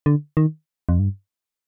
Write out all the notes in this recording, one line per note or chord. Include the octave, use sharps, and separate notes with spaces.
D3
D#3
F2
G2